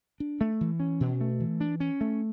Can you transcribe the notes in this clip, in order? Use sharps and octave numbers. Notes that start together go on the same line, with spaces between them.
D4
A3
E3
C#4
B2
A3
E3
D4
C#4
A3